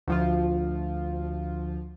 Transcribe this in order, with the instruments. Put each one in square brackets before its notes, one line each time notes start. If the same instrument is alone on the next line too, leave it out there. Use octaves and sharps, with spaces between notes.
[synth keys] D2 F3 F4